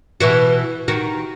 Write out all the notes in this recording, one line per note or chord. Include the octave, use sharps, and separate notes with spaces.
B2 E3 F#4
D#3 F#4